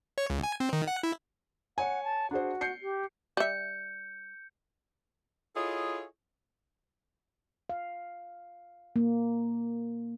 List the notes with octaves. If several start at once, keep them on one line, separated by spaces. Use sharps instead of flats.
C#5
C#2
G#5
C4
D#3
F#5
E4
C#5 F#5 G#5
A5
D4 F#4 G#4 C5
G6 C7 C#7
G4
G3 E5 G6 C#7
E4 F4 G#4 A4 C#5 D#5
F5
A#3